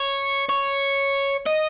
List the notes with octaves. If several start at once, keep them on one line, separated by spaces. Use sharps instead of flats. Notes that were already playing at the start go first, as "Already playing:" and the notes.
Already playing: C#5
C#5
D#5